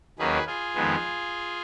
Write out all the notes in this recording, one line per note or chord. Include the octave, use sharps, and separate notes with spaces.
D#2 D#3 F#3 A#3 C#4 G#4 B4
F4 G#4
F2 D#3 G#3 B3